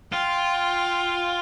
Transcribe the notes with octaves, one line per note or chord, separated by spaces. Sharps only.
F4 G5